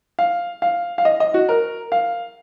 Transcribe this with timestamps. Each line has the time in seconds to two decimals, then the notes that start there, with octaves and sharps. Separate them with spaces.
0.19 F5
0.62 F5
0.98 F5
1.05 D#5
1.20 D#5
1.34 F#4
1.49 A#4
1.92 F5